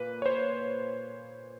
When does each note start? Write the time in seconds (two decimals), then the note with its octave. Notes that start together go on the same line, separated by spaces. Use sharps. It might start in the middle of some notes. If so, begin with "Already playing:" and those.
Already playing: A#2 A#3 B4
0.22 C#5
0.26 C5